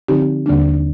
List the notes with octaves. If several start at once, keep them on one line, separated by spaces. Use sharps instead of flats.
D3 F3 C4 D#4 G4
D#2 D3 G3 A#3 D4